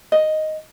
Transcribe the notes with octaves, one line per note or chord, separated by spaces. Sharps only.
D#5